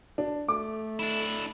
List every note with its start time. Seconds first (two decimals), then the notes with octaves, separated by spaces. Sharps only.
0.18 D4
0.48 A3 D6
0.99 D4 E4